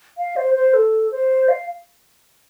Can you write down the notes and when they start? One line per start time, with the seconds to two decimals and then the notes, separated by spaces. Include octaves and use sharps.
0.18 F5
0.36 C5
0.55 C5
0.74 A4
1.11 C5
1.48 F5